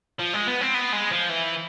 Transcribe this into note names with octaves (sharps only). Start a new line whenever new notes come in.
F3
G#3
B3
C4
B3
G#3
F3
E3